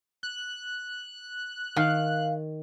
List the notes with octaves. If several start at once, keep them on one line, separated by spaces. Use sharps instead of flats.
F#6
D#3 F5